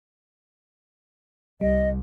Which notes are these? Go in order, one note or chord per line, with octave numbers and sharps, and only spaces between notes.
C2 G3 D#5